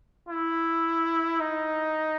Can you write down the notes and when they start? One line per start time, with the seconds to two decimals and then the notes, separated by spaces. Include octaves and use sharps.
0.29 E4
1.40 D#4